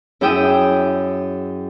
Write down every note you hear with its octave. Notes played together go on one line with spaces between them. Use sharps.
F#2 E4 G#4 G5 D#6 E6